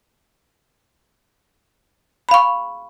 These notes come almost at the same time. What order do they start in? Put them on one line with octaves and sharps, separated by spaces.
B5 F5 C#6